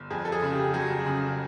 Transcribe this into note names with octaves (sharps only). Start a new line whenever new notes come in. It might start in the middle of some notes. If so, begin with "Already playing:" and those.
Already playing: G1
F2 G#4
A4
G#4
C#3
G4
F#3 G#4
C#3